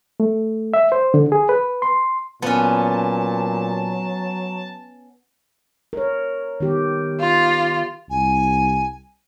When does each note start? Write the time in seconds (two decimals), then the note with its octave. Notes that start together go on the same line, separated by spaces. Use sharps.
0.20 A3
0.74 E5
0.92 C5
1.14 D3
1.32 G#4
1.49 B4
1.82 C6
2.42 A#2 F#3 B3 C#4 A5
5.93 A#4 C#5
6.60 D#3 B3 G4
7.20 F4
8.10 C2 G#5